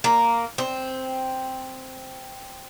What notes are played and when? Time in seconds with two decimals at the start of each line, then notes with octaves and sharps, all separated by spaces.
0.04 A#3
0.58 C4